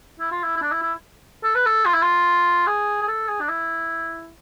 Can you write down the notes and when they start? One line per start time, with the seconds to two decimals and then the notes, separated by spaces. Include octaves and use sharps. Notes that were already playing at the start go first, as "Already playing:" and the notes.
0.20 E4
0.32 F4
0.43 E4
0.56 E4
0.62 D4
0.72 E4
0.82 E4
1.44 A4
1.55 B4
1.66 A4
1.85 F4
1.94 E4
2.03 F4
2.67 G#4
3.02 G#4
3.08 A4
3.28 G#4
3.40 D4
3.49 E4